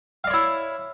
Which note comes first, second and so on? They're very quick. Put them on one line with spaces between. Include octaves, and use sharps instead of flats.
F5 D5 C#5 E4